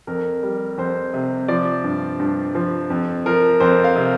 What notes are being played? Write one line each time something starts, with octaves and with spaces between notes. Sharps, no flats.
F2 A#4
G3
F2 C5
C3
F3 D5
G2
G2
F3
F2
F3 A#4
F2 C5
F5
C3